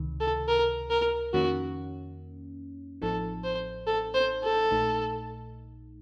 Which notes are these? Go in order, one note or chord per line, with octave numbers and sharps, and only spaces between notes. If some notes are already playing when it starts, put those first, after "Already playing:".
Already playing: C#2 C3 D#3
A4
A#4
A#4
F2 D#3 A#3 C#4 F#4
A1 A2 F3 C4 D#4 A4
C5
A4
C5
A4
A#1 A#2 A3 D#4